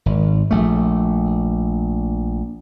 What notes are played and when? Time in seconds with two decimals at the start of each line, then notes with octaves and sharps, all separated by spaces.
0.06 G#1
0.51 A#1 A3